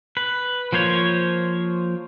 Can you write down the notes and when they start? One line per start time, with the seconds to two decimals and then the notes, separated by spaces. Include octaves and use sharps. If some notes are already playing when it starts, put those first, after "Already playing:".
0.17 B4
0.73 F3 A#3 C5 C#5